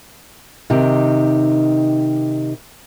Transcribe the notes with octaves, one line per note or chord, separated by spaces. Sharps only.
C3 D#3 D#4 G4